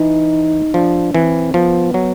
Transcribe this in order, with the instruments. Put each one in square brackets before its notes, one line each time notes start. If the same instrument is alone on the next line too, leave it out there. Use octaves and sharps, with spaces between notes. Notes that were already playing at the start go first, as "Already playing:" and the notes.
Already playing: [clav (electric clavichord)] E3 [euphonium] D#4
[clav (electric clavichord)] F3 [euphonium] D4
[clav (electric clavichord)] E3 [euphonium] C4
[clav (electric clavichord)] F3 [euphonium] B3
[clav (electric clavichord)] F#3